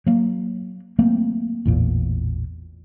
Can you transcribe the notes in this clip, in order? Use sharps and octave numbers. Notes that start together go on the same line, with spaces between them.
F#3 A#3
F#3 A3 A#3 C4
A1 E2 A#2